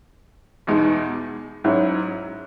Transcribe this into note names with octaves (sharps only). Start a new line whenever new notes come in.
E2 B2 G#3 D#4
G#2 F#3 C#4 E4